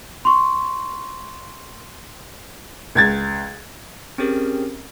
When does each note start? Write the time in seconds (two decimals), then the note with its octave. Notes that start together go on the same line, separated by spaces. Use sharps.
0.25 C6 C#6
2.95 C#2 G#6 A6
4.18 C4 C#4 G4 G#4 A#4